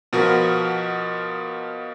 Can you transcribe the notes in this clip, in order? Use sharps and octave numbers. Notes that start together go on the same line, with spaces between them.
B2 F3 F#4 A#4 B4